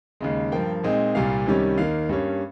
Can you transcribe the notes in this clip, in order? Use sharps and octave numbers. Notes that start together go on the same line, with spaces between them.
D#2 C#3 G#3
G2 F3 A#3 G5
A#2 G#3 C4 D#4
C2 A#2 G3 A#3 F5
C2 C3 D#3 G3 C#4
D#2 D#3 A#3 F5
G2 G3 A#3 C#4